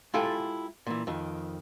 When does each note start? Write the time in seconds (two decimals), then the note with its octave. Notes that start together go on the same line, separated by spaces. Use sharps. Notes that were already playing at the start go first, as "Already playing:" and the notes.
0.14 G#3 E4 F4 G4 A4 G5
0.86 A#2 E3
1.07 F2 D#3